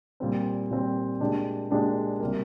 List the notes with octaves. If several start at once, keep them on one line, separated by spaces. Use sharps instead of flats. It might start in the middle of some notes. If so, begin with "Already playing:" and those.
A#2 G3 C4
A#2 G3 C4
A#2 G#3 D4 G4
A#2 G#3 D4 G4
C3 G3 A#3